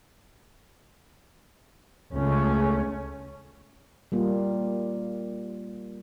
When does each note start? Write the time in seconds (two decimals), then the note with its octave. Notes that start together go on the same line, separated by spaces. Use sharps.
2.13 C#2 A3 C#4
4.12 G3 A#3 F4